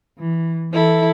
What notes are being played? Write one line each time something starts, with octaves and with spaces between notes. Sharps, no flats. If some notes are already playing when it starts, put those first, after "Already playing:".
E3
E3 E4 A4